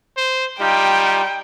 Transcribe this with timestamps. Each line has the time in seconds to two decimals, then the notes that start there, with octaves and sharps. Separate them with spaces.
0.17 C5
0.60 G3 D#4 F4 G4 G5